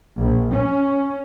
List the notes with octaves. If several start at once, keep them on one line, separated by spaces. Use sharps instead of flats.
A#1
C#4